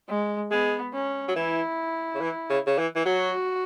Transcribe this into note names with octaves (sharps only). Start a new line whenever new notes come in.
G#3
G#3 B3
C#4
F#3
E3 E4
C#3
E3
C#3
C#3
E3
E3
F#3 F#4